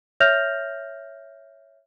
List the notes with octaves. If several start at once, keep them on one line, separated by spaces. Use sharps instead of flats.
C#5 E5 F6 G6 A#6 F7